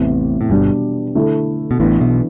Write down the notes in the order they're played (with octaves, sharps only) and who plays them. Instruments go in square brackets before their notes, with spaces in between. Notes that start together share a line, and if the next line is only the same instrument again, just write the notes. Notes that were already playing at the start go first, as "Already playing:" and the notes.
Already playing: [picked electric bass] A1 A2 [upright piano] E2 C3 E3
[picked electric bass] A2
[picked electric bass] G1 G2 [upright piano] B2 G3 D4
[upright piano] D3 A3 E4
[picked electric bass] B2
[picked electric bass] A1 A2 [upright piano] E3 B3 D4
[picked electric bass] B1 B2